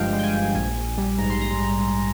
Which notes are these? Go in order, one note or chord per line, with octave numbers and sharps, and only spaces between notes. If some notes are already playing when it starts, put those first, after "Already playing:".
Already playing: G1 G2 F3 G#3 D#5 F5 G5
G#3
G5
G#5
G1
A#1 G#5
A#1
G3
G#2 A#5
C6
A#1 A#5